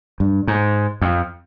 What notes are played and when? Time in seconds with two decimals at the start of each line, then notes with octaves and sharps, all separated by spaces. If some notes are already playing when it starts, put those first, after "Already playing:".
0.20 G2
0.47 G#2
1.02 F2